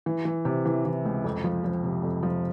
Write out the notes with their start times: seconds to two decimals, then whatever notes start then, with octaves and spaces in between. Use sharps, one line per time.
0.06 E3
0.25 E3
0.45 C3
0.65 E3
0.85 E3
1.05 C#2
1.24 F2
1.44 F3
1.64 F3
1.84 C3
2.03 F2
2.23 F3